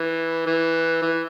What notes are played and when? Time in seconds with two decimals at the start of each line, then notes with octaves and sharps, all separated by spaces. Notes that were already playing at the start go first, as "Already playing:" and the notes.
Already playing: E3
0.46 E3
1.02 E3